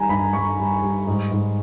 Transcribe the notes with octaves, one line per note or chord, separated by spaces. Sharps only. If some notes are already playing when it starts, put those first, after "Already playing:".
Already playing: D#3 G3 G#5 A#5
G2 B5
G2 C#6
G3
G3
G#2
G#2